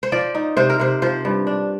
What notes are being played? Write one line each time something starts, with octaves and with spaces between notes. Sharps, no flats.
C5
F3 D5
D#4
C3 C5
A#4
C3 C5
F3 C5
G2
D4